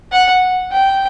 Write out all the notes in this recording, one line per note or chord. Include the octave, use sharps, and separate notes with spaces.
F#5
G5